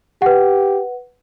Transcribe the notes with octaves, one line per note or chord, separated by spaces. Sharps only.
G4 B4 F#5